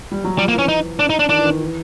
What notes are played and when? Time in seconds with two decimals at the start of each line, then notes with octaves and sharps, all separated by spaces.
0.12 G3
0.24 F#3
0.38 F3 G3
0.48 A#3
0.53 E3
0.58 C#4
0.69 D#4
0.99 D4
1.10 D#4
1.19 D4
1.29 D#3 D4
1.38 E3
1.45 D#3
1.61 E3